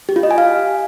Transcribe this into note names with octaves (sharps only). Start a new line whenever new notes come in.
G4
F4
D#5
G#5
F5